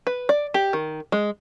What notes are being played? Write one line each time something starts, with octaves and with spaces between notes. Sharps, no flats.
B4
D5
G4
D#3
G#3